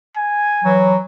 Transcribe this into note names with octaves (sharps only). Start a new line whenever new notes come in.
G#5
E3 F#3